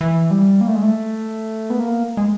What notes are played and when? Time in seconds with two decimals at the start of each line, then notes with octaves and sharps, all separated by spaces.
0.01 E3
0.31 G3
0.61 A#3
0.68 A3
0.75 G#3
0.82 A3
1.70 B3
1.80 A#3
2.17 G#3